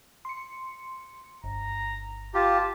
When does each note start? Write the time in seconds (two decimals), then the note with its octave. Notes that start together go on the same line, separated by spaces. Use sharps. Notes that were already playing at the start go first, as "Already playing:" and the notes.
0.25 C6 C#7
1.44 G1 A#5
2.34 F4 G4 A5